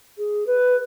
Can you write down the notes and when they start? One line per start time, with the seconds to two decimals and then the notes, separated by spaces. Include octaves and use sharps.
0.18 G#4
0.47 B4